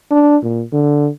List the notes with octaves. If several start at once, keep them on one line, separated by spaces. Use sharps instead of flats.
D4
A#2
D3